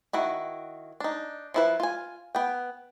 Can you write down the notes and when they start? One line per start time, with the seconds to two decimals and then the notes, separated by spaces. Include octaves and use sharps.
0.13 D#3 E4 F#4
1.00 D4 D#4
1.54 F3 E4 B4
1.80 F4 G#5
2.35 B3 G5